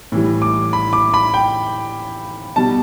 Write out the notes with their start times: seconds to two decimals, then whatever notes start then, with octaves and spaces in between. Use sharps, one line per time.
0.12 A2 E3 G3
0.42 D6
0.73 B5
0.93 D6
1.14 B5
1.34 G5
2.56 B2 G3 A5